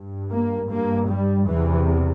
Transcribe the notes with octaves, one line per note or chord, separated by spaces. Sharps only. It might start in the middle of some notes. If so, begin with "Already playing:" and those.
Already playing: G2
A#3
G2 A#3
G3
E2 C3 E3